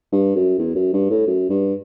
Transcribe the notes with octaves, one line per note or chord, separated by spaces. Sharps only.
G2
F#2
E2
F#2
G2
A2
F#2
G2